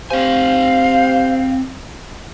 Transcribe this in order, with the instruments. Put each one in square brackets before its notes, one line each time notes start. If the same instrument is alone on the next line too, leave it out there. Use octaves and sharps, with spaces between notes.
[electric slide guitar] C4 G#5 [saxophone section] G4 C5 [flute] F5